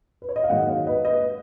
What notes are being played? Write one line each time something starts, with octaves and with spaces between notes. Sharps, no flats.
B4
C#5
D#5
F5
G#2 D#3 F#3 A#3 D#5 F#5
C#5 F5
B4 D#5
B4 D#5